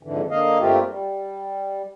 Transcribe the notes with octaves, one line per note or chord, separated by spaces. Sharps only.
F2 G#2 D3 E3
D3 A#3 D#5 F5
G2 A3 A#3 C4 F4 G4
G3